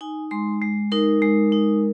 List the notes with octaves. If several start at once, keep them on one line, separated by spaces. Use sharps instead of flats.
D#4 G#5
G#3 C6
G#3
D#4 A#4
G#3
D#4